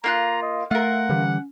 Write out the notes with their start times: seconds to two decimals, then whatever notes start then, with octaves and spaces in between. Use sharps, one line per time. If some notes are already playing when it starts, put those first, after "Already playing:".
0.04 A#3 F4 A#5 F#6
0.42 D#5
0.71 A3 F4 A#4 E5 F#5
1.09 D3 E3 G3 C#4